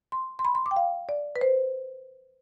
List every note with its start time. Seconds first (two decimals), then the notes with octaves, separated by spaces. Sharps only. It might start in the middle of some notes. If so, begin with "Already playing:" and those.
0.12 C6
0.39 C6
0.45 B5
0.55 C6
0.66 D6
0.71 G5
0.76 F5
1.09 D5
1.36 B4
1.41 C5